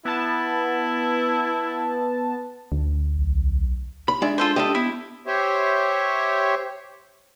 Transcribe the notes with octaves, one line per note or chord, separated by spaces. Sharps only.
B3 E4 A5
D2
B1
B5
G#3 D4 D5 E5
F4 A4 C5
G4 A4 D#5 E5
B3 E4
G4 C5 C#5 E5